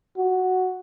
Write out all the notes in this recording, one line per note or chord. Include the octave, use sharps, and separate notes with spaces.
F#4